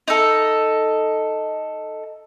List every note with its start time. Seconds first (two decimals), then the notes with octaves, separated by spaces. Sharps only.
0.08 D#4 A4